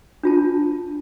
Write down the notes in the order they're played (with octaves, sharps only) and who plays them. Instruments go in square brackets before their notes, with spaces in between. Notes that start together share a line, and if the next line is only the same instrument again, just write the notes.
[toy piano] D4 F4 A5